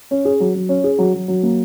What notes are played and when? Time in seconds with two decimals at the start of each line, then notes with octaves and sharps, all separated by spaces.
0.11 C#4
0.25 G#4
0.40 F#3
0.55 F#3
0.69 C#4
0.84 G#4
0.98 F#3
1.14 F#3
1.28 F#3
1.43 A#3